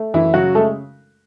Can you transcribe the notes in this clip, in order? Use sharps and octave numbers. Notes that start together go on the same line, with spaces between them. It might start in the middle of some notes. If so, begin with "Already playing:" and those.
Already playing: A3
F#2 E3 E4
C#3 F#3 F#4
G#3 A3 A4